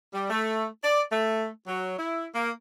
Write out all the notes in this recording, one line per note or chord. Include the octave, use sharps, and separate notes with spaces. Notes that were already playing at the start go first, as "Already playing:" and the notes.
G3
A3
D5
A3
F#3
E4
A#3